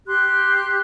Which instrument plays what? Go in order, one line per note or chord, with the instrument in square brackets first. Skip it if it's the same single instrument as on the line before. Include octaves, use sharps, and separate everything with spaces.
[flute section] G4 C6 F#6